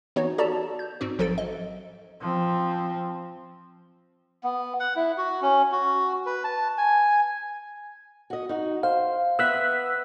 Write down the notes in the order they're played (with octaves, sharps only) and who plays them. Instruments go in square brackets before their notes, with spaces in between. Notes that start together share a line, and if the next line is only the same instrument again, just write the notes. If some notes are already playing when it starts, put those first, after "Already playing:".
[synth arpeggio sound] E3 B3 D#4 F#4 C#5
F#4 G4 A4 D5 A5 A#5
G6
G#2 C4 F#4
A1 F3 F#3 A4 A6 D7
D#5
[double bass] F3 C4
[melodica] B3
F#5
E4
F#4
C#4
F#4
B4
A5
G#5
[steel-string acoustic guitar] F#4 D#5
D#4 F#4
[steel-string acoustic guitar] C5 [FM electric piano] F5
[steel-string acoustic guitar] B3 E5 [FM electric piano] E6 F#6 B6